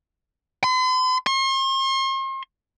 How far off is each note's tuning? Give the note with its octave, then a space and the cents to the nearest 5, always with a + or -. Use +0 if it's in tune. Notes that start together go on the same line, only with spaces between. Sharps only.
C6 -45
C6 +45